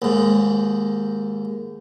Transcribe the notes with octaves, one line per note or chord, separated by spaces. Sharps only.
D#2 G#2